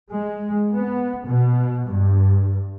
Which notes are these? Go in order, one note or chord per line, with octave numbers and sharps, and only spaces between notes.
G#3
B3
B2
G2